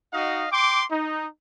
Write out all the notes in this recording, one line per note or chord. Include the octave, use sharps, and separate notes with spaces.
D#4 F#4 D#5 F5
G5 C6 D6
D#4